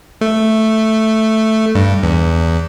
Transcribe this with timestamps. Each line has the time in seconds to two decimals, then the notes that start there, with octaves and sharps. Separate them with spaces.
0.21 A3
1.75 G2
2.03 E2